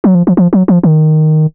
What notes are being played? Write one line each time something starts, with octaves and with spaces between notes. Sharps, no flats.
F#3
F3
F3
F3
F#3
F3
D#3